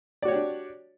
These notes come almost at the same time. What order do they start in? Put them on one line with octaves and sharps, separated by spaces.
D5 F#4 C#5 G4 D4